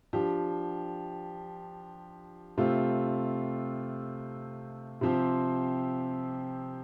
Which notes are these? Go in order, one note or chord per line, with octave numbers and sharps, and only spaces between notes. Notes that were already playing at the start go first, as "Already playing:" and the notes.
F3 D4 G4
C3 A3 C4 F4
C3 F3 C4 G4